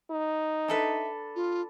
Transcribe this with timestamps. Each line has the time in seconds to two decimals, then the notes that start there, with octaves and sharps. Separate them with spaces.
0.11 D#4
0.68 D4 A4 B4 E5
1.35 F4